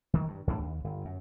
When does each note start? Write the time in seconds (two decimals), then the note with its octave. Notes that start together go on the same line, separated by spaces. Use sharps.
0.14 D#3 E3
0.28 G2
0.47 E2 A2 C#4 D4
0.60 D#2
0.84 G1
1.05 F#2